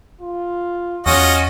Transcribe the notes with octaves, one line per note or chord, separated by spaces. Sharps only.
F4
E2 C#4 F4 F#4 D#5